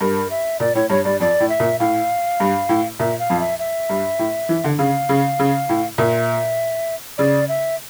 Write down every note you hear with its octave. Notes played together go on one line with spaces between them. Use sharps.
G2 A#4
E5
A#2 D5
A2 C#5
G2 C#5
G2 D5
F2 D5
A2
E5
A#2
A2 F5
G2
A2
A#2 E5
F5
F2
E5
E5
G2
A2
E3
D3
C#3 F5
C#3
C#3
A2
A#2 E5
C#3 D5
E5